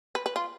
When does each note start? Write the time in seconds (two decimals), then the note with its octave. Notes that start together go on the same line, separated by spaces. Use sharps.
0.15 B4
0.26 B4
0.36 F4